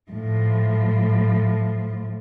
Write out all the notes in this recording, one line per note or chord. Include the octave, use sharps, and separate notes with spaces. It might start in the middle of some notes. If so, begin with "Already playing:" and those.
A2 F3